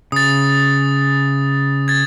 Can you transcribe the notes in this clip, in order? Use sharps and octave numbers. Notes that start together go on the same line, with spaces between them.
C#3 D#6 A6
G#6 A6